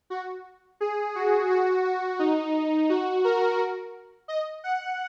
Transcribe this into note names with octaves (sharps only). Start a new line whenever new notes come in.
F#4
G#4
F#4
F#4
F#4
D#4
F#4
A#4
D#5
F#5